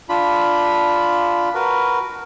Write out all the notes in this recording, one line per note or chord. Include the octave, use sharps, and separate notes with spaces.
D4 F4 B5
F#4 A#4 B4